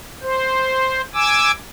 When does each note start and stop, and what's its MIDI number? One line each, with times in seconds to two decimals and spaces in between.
0.22 1.02 72
1.14 1.51 80
1.14 1.51 86
1.14 1.51 88